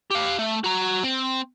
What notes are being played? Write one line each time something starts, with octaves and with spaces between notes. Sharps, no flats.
G4 F5
A3
F#4 A#5
C4